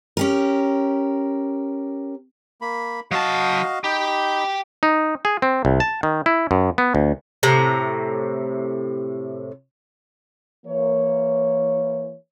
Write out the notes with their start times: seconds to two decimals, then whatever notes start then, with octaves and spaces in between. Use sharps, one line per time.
0.17 C#4 G4 A#4
2.61 A#3 B5
3.11 F#3 F#4 D#5 F5 A5
3.84 D#4 G4 B5
4.83 D#4
5.25 G#4
5.42 C4
5.65 C2
5.80 A5
6.03 D#3
6.26 E4
6.51 F#2
6.78 B3
6.95 D2
7.43 A2 C3 A#5
10.66 E3 A#3 C#5